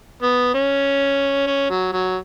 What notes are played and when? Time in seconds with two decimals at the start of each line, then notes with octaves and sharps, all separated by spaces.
0.22 B3
0.54 C#4
1.47 C#4
1.70 F#3
1.93 F#3